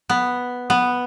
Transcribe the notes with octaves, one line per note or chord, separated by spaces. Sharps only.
B3
B3